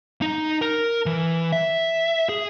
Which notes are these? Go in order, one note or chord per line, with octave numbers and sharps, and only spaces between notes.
D#4
A#4
E3
E5
G#4